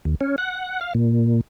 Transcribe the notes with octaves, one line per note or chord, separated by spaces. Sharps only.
D#2
C#4
F#5
F5
A#2